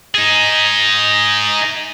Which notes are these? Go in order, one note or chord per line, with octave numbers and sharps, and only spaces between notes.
D#4 G#4